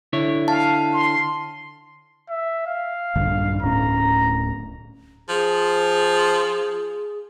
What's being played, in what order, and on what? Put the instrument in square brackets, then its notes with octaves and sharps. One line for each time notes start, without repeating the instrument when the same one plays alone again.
[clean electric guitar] D3 E4 C#5
[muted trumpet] F5 [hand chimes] A5
[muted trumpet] C6
[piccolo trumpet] E5
F5
[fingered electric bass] A#1 G2 D3
[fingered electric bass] D1 A2 C#4 [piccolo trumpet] A#5
[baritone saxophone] F3 [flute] G#4